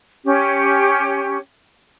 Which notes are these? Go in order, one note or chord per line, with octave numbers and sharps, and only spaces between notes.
C#4 G4